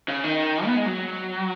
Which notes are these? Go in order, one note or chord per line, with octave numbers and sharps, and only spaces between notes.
C#3
D#3
B3
G#3
F#3